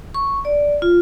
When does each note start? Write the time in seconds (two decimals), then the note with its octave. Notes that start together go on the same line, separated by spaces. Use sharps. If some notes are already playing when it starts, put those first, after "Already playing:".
0.15 C#6
0.45 D5
0.82 F4